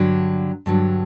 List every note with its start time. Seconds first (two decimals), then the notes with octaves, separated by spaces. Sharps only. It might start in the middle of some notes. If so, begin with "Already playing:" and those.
Already playing: G2 D3 F#3
0.66 G2 D3 F#3